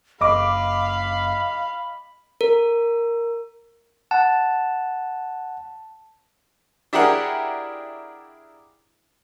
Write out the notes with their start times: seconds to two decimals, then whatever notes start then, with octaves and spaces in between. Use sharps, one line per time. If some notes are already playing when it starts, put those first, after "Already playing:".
0.21 F#1 D#5 F5 B5 D6
2.41 A#4
4.11 F#5 A5
6.93 D4 E4 G4 G#4 A#4 F#5